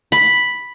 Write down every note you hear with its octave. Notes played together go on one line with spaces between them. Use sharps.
B5